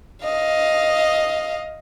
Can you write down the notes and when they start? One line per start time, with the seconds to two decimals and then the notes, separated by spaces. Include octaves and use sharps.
0.24 D#5 F5